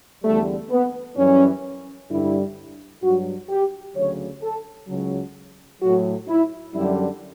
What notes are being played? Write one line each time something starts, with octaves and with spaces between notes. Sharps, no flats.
E2 D3 G3 A3
B3
F#2 E3 G3 C#4
G2 D3 G3 E4
G2 F#3 F#4
G4
D2 C#3 F#3 C#5
A4
C#2 C#3 F#3
A2 F#3 F#4
E4
F#2 D3 G3 E4